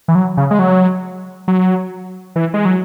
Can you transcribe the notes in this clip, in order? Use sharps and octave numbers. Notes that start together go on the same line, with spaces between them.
E3
F#3
C#3
G#3
F#3
F#3
E3
G#3
F#3